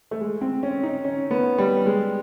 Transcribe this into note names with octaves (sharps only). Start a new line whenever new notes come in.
A3
G#3
C4
C#4
D#4
C#4
B3
G3
G#3